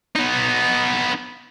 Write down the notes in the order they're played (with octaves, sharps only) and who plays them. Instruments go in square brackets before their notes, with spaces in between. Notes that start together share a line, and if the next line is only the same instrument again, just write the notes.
[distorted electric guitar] B3 D#4